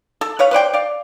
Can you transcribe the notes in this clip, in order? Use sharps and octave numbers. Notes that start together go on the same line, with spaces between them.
A4
B4 C#5 F5
B4 C5 D5 G5
D5 F5